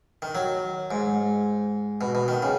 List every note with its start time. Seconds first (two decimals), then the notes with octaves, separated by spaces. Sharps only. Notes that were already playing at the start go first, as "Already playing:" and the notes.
0.22 D#3
0.35 F#3
0.91 G#2
2.01 B2
2.15 B2
2.28 D#3
2.42 C#3